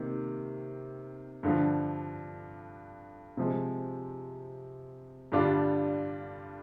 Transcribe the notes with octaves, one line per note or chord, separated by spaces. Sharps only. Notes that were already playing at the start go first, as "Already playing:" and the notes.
Already playing: C3 D#3 A#3
G2 D3 F3
C3 F3 G#3
G2 D3 G3 D4 F4